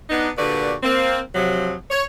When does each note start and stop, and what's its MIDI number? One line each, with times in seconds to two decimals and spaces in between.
0.10 0.30 59
0.10 0.30 62
0.10 0.30 63
0.37 0.73 46
0.37 0.73 50
0.37 0.73 66
0.37 0.73 67
0.37 0.73 71
0.37 0.73 74
0.83 1.19 58
0.83 1.19 60
1.35 1.74 48
1.35 1.74 53
1.35 1.74 54
1.91 2.03 73